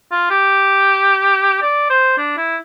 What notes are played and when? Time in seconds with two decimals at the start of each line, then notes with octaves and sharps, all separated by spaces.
0.11 F4
0.30 G4
1.62 D5
1.90 C5
2.17 D4
2.37 E4